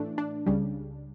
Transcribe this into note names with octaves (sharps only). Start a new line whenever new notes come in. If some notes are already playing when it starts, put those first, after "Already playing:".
Already playing: A2 E3 A3 D4
D4
C#2 C#3 G3